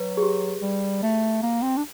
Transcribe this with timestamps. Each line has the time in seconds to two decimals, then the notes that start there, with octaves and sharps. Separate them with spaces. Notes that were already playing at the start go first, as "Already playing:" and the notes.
Already playing: F#3 B4
0.17 G#4
0.22 G4
0.61 G3
1.02 A3
1.42 A#3
1.62 C4
1.77 D4